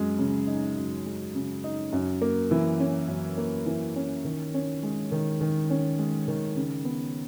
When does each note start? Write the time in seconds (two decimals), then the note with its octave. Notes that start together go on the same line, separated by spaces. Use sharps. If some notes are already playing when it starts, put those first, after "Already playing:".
Already playing: F#2 G#3
0.19 C#3
0.47 D#4
0.77 F#2
1.06 G#3
1.35 C#3
1.64 D#4
1.93 F#2
2.22 A#3
2.51 E3
2.80 C#4
3.08 F#2
3.38 A#3
3.66 E3
3.96 C#4
4.24 D#3
4.54 C#4
4.83 G#3
5.12 D#3
5.41 D#3
5.70 C#4
5.99 G#3
6.28 D#3
6.56 C#3
6.85 B3